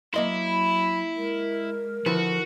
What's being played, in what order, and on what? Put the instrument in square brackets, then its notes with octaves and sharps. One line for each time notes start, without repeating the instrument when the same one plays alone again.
[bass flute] F#3 [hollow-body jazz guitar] A#3 D#5 C6 [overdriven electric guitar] E4
[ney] B5
[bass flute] G#3 [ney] A#4
[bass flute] D3 [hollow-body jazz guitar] F3 E4 B4 [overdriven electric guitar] F#4